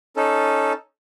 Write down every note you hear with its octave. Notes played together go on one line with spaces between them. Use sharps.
C#4 D#4 A4